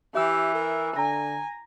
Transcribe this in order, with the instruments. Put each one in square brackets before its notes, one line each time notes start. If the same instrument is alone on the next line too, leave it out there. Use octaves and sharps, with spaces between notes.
[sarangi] E3 [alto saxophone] G4 [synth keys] E5 E6
[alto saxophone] A#4
[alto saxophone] D3 [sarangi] G#5 [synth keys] A#5 A#6